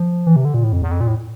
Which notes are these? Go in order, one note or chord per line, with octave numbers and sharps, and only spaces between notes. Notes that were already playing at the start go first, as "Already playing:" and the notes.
Already playing: F3
E3
C3
D3
A#2
A2
F2
E2
F2
A#2
A2